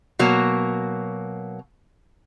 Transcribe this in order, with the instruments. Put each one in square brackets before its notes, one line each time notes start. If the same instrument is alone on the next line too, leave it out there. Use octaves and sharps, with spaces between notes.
[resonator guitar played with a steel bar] B2 F#3 A#3